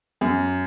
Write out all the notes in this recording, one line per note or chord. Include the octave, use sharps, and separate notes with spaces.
F#2